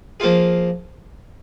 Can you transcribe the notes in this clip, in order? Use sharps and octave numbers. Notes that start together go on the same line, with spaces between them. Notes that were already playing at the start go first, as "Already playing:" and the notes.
F3 A#3 F4 G#4